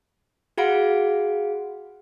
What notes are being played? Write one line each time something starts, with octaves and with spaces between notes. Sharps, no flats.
F#4 G#4 F5 F#5 B5 D7